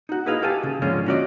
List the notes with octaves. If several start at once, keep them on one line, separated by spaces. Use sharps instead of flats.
D#4 F#4
D#4 E4 G#4 B4 D#5 F5
F#4 G4 A4 F5 G#5 A5
C#3
G#2 D3 F3 G#3 C#4 F4
C#4 D4 F#4 A4 D5 D#5